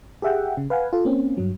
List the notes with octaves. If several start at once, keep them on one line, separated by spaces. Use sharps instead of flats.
G4 G#4 E5 F#5 G5
C#3
B4 F5 F#5 G#5
F4 A4
A#3 C4 C#4
G2 F#3